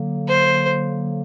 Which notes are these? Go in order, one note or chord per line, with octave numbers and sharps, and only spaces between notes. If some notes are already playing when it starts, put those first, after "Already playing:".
Already playing: D3 F#3 A#3
C5